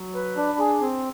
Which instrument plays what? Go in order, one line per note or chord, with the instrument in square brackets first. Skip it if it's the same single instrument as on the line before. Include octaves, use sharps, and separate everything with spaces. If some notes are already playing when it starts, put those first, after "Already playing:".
Already playing: [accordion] F#3
B4
D4
G#4
C4